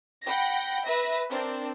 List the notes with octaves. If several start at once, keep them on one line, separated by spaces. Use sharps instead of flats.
F#5 G5 B5 A#6
B4 E5 A#6
C4 D4 A#4